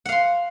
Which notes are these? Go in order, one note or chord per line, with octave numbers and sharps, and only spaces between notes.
F5 F#5 C6